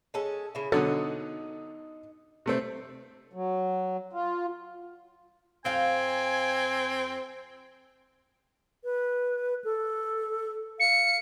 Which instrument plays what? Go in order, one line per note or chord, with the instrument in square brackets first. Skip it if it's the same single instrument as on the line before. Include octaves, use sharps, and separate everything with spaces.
[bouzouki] G#3 C#4 A4
C#3 E4
[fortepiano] B2 D3 F#3 [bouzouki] D#4 D#5 [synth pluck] A4
[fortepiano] C3 A3 C4
[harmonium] F#3
F4
[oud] F2 F5 [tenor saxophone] C4 [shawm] G#5
[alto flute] B4
A4
[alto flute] F5 [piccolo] C#7